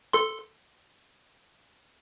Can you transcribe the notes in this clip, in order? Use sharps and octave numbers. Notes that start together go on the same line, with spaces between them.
A4 C6